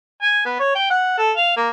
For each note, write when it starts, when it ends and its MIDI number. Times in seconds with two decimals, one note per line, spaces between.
0.22 0.42 80
0.46 0.55 59
0.60 0.72 73
0.75 0.86 79
0.90 1.14 78
1.18 1.32 69
1.36 1.54 77
1.57 1.69 58